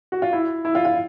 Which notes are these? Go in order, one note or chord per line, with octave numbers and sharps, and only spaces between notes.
F#4
F4
E4
E4
F4
F4